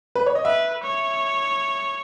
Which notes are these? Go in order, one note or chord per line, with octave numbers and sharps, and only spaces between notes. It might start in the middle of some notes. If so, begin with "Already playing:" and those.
B4
C#5
D#5
B4 E5
C#5